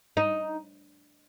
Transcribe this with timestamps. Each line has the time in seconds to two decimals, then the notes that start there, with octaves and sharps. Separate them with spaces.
0.17 D#4